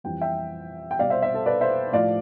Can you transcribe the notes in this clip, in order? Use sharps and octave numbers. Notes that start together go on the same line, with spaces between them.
F2 E3 G3 G5
E5 G5
G5
C2 B2 G3 D5 F5
C5 E5
C5 E5
A4 C5
B4 D5
C5 E5
A2 F3 D5 F5